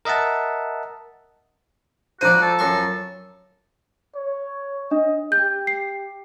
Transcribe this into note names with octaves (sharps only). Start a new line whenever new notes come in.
A#4 D#5 E5 F#5 A5
F3 F#4 C5 D5 A#5 D#7
A4
F#2 C6 C#6
C#5
D4 D#5
G4 G6
C7